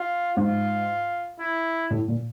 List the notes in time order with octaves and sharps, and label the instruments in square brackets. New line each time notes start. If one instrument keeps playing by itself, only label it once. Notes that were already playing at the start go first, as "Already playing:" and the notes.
Already playing: [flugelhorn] F4
[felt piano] G#2 [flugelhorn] F4
[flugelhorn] E4
[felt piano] A2
A#2